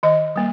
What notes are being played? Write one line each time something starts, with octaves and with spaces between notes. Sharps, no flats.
D#3 D#5
G3 A#3